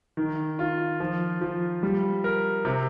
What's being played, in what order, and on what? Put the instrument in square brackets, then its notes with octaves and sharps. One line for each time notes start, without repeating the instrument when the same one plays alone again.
[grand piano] D#3
F4
F3
F3
G3
A#4
C3